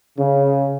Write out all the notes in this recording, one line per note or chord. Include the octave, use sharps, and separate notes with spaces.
C#3